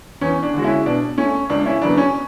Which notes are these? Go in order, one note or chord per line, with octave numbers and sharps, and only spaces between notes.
E2 C#4
D4
D3 G#3 F#4
C#4 E4
B2 D4
A3 C#4
C#2 D4
C#4 E4
C#3 F#3 B3 D4
C#4